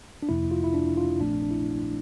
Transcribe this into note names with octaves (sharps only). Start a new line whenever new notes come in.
D4
F2 C3 F3 A#3 E4
F4
E4
D4
F4
A#1 A#2 F3 A3 C4 D4
D4
E4